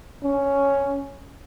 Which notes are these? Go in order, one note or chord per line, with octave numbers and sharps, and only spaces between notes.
C#4